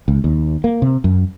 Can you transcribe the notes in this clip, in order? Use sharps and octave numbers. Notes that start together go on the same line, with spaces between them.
C#2
D#2
A#3
C3
F#2